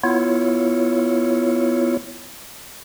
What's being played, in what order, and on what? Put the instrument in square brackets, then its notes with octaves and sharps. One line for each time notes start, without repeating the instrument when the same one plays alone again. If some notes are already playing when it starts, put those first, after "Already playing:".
[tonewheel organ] B3 E4 F4 C#5